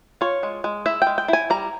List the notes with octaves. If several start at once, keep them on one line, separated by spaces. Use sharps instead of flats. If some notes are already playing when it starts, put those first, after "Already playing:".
F4 C#5
G#3
G#3
E4 E5
G#3 G5
G5
E4 G#5
G3 A#5